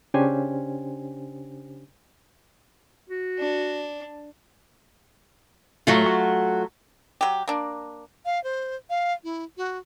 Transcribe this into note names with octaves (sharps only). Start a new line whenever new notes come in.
C#3 C#4 D4 G4 C5 G#5
F#4
D4
A2 F#3 A3 F4
F#4
F#3 G4
A#3 D4
F5
C5
F5
E4
F#4